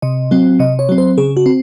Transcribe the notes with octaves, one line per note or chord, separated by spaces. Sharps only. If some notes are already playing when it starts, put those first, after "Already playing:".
C3 D#5
F#3 C4
C3 D#5
C#5
F#3 C4
C5
C#3 G#4
F#4
C4